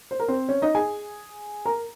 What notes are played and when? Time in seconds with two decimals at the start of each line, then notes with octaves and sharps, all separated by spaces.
0.11 C5
0.20 A#4
0.28 C4 C5
0.49 C#4 C#5
0.62 D#4 D#5
0.75 G#4 G#5
1.65 A#4 A#5